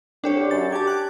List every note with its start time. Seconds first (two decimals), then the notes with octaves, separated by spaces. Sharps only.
0.24 C2 D4 G4 C#5
0.36 D3
0.51 F#2 A6
0.72 G4 A5 G#6
0.87 D6 F#6